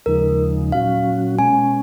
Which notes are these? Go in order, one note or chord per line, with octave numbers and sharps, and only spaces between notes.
D#2 C#3 F3 G#3 D#4 A#4
A#2 F#3 C#4 F#4 F5
B2 G#3 C#4 G#5